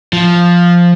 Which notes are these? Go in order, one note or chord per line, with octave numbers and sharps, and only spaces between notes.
F3